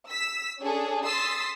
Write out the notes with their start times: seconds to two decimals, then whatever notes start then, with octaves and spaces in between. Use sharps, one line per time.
0.10 E6 B6
0.61 C#4 D4 G#4 A4
1.05 C6 D#6 E6 A6 B6 C7